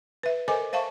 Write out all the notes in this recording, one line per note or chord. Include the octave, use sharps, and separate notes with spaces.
B4 E5
A4 A#4 C5 D#5 G#5 D6
C5 E5 F5 A5 C#6